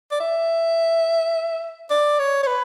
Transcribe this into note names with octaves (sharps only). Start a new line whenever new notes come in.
D5
E5
D5
C#5
C#5
B4